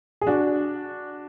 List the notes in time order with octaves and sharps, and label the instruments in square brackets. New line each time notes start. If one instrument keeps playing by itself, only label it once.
[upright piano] G#4
D4 F#4